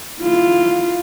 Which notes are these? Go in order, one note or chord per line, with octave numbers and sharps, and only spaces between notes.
E4 F4